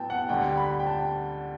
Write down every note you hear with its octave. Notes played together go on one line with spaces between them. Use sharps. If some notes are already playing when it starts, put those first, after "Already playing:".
Already playing: A2 F#3 B3 G5 A5
F#5
D2 D3 G3 G5
B5
G5
A5